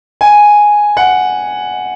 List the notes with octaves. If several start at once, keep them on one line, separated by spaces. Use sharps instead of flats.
G#5
F#5